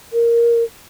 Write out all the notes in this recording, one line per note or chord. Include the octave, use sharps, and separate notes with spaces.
A#4